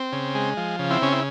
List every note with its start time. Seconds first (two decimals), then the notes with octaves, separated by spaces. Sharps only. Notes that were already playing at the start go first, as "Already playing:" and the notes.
Already playing: C4
0.12 C#3
0.35 G#3
0.57 F3
0.79 C#3
0.91 C4 E4
1.02 C#3 C#4
1.12 E4